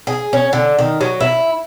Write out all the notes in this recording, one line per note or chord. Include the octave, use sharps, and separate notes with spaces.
G#4
C#4
D3
D#3
F#3
E4